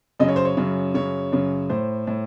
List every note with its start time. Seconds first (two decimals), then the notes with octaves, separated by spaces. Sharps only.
0.20 F#2 C#3 D#5
0.28 C#5
0.36 C5
0.45 C#5
0.57 F#2 C#3
0.94 F#2 C#3 C#5
1.32 F#2 C#3
1.69 A2 C5
2.07 A2